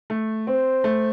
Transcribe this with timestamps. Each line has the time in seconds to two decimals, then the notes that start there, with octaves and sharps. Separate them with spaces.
0.10 A3
0.47 C4 C5
0.84 A3